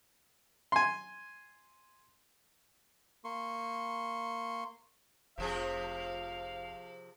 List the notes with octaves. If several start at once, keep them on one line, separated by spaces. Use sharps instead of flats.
G#5 C6
A#3 C6 C#6
F1 C3 F3 G#4 F5